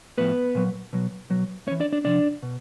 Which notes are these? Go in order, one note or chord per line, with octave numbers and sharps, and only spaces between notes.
A2 F3 B3 B4
A#2 F#3
B2 F#3
B2 F#3
A2 C#4 C#5
E3
D4 D5
D4 D5
C3 F3 D4 D5
B2